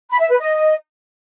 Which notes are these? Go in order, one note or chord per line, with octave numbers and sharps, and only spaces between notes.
B5
E5
B4
D#5